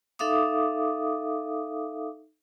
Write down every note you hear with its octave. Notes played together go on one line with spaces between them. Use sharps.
D#4 A4 E5 F5 D6 D#6